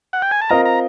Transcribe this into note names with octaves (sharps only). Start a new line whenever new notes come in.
F#5
G5
G#5
A5
C4 F4 A#4 D#5 A#5
A#5